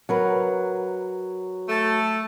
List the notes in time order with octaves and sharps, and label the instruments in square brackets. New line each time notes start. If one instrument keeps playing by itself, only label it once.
[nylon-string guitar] F#3 A#4 B4
[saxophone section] A3